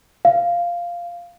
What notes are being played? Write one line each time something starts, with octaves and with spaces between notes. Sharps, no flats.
F5